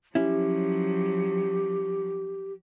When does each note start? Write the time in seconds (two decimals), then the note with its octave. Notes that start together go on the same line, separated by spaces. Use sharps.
0.15 F3 F#3 C#4 E4 G4